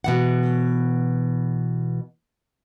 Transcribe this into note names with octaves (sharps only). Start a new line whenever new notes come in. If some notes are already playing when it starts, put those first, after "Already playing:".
B2 E3 F#5